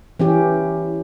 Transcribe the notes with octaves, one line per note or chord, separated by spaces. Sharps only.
E3 C#4 G4